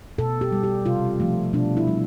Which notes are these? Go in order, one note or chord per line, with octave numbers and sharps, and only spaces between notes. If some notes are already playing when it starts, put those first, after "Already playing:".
B2 A4
G4
G3
G4
C3 F4
F3 A3
B2 D4
E4
G3